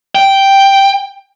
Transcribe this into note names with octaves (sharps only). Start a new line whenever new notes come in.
G5